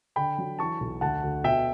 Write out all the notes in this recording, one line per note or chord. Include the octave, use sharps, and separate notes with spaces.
D3 G5 B5
F#3
E3 A5 C#6
B1
D2 F#5 A5
D2
B2 E5 G5